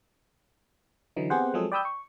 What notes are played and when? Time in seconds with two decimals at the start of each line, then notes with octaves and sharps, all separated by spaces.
1.16 D3 E3 F#3 D#4
1.30 B3 C4 G4 G#4 C5 F#5
1.54 F3 F#3 G#3 C4 G#4 A4
1.72 D5 G5 B5 D#6 E6 G6
1.85 C#6